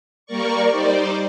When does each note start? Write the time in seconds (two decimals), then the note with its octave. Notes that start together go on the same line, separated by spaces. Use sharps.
0.26 G3 A#3 A#4 D5 C#6
0.69 G3 D#4 C5 D5